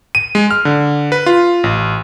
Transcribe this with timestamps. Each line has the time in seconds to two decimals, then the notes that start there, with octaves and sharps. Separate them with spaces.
0.15 D#7
0.35 G#3
0.51 F6
0.65 D3
1.12 B4
1.26 F4
1.64 A1